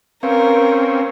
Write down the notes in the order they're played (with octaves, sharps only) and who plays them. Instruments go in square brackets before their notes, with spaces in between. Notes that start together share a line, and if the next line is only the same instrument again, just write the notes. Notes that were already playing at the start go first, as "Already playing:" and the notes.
[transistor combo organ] C4 C#4 [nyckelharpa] A#4 [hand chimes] B4 F5